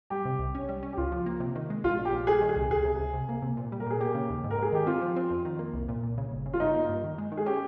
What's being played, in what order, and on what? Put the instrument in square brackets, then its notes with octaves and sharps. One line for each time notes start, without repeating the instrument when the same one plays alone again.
[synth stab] G3 [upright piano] G4
[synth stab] C3
C2
C#4
G3
C#4
[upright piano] G4
[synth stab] C#2 [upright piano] F4
[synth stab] F3
A#3
C3
D#3
G#3
[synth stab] A#1 [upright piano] F4
[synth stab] A#1
[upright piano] G4
[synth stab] A#1
[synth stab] G3 [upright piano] G#4
[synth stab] D#3
[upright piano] G#4
[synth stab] C2
[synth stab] C#2 [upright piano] G#4
[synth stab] C3
C#2
C3
A#3
C3
A#2
G3
[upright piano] A#4
[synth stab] A#2 [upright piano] G#4
[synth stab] A#3 [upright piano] G4
[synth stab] C#3
D#2
G#2
[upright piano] A#4
[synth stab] G#2 [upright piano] G#4
[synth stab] D#3 [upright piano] G4
[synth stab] C4 [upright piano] F4
[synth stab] F3
C4
F2
D#3
A#3
C2
A#2
A#2
C#3
G1
C#3
[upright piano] F4
[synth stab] G2 [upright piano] D#4
[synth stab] A#3
G2
D#3
G#3
D#3
[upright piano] G#4
[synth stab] C#4 [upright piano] G4